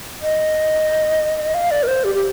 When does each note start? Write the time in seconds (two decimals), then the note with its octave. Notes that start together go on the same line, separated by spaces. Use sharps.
0.22 D#5
1.54 F5
1.71 D5
1.83 A#4
1.87 C5
2.04 G4
2.15 G4